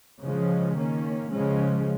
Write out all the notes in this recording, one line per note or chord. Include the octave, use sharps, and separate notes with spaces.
C#3 F3 G#3 C#4
D#3 A#3 C#4
C#3 F3 G#3 C#4